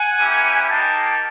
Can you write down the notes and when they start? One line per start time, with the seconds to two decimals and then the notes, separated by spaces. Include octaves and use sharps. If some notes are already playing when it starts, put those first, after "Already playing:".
Already playing: F#5 G#5
0.19 A#3 C#4 E4 G4
0.70 A#3 D#4 G4 G5 A5